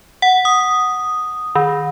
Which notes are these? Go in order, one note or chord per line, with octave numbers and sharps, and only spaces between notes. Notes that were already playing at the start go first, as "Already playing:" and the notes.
F#5
D#6
D#3